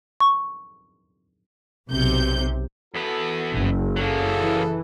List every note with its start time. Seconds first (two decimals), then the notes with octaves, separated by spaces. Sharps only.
0.20 C#6
1.89 B1 C3 G6
2.94 E2 F#4 A4 B4
3.54 F#1
3.96 F#3 A#3 E4 G#4 A4
4.34 E3